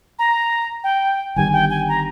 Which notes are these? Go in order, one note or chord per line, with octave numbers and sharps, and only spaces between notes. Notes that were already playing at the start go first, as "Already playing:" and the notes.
A#5
G5
G1 G2 D#3 G3 G#5
G5
G#5
A#5